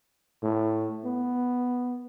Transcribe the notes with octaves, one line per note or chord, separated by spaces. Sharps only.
A2
B3